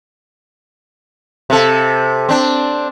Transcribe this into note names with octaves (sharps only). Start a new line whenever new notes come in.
C3 A4
C4 D4